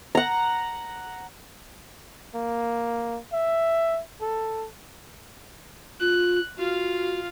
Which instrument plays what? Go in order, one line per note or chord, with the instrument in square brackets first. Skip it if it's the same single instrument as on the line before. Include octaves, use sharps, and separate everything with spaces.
[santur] F#5 A#5
[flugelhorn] A#3
E5
A4
[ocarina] F4 [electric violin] F#6
[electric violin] F4 F5 [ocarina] F#4